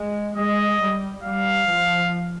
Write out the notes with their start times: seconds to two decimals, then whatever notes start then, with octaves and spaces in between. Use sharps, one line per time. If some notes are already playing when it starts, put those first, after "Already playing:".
Already playing: G#3
0.36 G#3 D#5
0.80 G3
1.23 G3 F5
1.66 F3